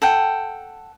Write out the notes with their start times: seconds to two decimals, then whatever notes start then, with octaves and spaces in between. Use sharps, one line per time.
0.02 A4 F#5 G5